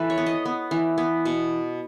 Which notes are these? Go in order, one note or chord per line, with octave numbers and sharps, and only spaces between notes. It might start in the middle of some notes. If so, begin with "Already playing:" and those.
Already playing: E3 F#4 A4 B4
C#5
B3
D#5
B3
E3
B3
B2